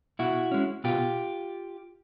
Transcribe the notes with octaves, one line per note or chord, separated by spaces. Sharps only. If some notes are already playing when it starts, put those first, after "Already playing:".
B2 E4 F#4
G#3 C#4
B2 F4 G4